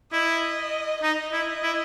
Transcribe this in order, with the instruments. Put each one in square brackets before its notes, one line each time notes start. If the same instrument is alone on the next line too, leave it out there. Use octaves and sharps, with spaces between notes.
[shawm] E4 [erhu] D#5
[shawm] D#4 [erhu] D#5
[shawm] E4
E4